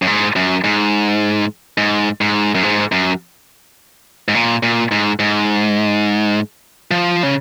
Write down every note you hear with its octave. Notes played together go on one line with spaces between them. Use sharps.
F#2
G#2
F#2
G#2
G#2
G#2
F#2
G#2
F#2
G#2
A#2
A#2
G#2
G#2
F3
C#3